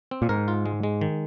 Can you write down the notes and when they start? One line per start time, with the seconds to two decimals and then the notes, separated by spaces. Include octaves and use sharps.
0.11 C4
0.22 A#2
0.29 G#2 A#4
0.48 F4
0.66 G#3
0.83 G#3
1.01 D#3